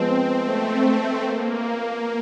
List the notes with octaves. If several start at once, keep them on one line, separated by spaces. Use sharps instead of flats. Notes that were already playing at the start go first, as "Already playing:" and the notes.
Already playing: F3 G#3 B3 C4
A3
A#3